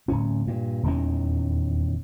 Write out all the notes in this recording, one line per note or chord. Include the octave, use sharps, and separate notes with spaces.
D1 C#4
G2 A#2
D#1 E2 D#3 C#4